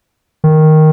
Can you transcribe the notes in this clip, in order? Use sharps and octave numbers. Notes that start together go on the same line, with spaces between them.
D#3